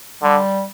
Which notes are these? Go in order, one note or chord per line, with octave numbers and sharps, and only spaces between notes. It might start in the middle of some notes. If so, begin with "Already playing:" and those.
D3 G3